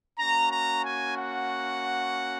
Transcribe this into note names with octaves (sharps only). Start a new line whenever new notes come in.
A#3 C#4 F#4 A#5
A#5
G#5
F#5